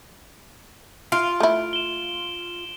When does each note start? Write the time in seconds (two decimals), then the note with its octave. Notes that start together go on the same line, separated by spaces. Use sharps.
1.12 F4 D7
1.40 A3 E4
1.73 E7 G7